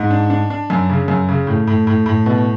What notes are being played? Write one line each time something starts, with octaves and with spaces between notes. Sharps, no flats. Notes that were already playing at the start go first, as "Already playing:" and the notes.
Already playing: G#2
D4
D4
D4
F#2
C#3
F#2
C#3
A2
A2
A2
A2
B2